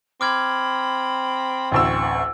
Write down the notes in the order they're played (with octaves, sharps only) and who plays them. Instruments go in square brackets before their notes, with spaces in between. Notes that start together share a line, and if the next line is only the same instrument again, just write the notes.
[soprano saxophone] C4 [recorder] B5 [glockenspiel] D6 F6 G#6
[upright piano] A1 D2 E6 [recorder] C#6